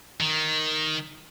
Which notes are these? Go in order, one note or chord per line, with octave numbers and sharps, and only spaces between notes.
D#3